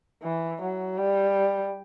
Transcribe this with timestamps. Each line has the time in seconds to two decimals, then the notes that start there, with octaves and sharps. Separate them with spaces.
0.23 E3
0.61 F#3
0.97 G3